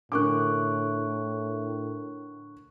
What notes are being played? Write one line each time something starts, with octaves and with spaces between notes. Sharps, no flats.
A2 D3 D4 A#4 C#6 D6 F#6